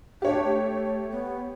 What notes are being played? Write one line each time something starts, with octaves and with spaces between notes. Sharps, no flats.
D4 G4 C#5
A3
B3